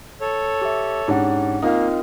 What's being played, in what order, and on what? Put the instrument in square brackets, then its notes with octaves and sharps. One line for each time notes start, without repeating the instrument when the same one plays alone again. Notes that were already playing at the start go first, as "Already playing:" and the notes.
[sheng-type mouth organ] A4 C#5
[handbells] G4 E5
[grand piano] G#2 C#4 D4 [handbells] G4 F#5
[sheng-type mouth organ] A#3 [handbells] C4 F4 A#4 [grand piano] D#4 F5